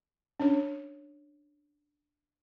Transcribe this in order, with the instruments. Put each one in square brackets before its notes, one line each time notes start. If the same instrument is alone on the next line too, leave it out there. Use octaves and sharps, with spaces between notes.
[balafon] C#4 D4 C#5